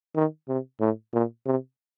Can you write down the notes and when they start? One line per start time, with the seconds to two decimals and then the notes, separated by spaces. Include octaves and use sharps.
0.15 D#3
0.48 C3
0.80 A2
1.13 A#2
1.46 C3